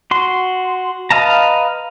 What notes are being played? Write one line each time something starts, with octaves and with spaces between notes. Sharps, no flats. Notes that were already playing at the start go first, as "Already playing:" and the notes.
F#4 C6
B4 D#5 F5 A5 A#5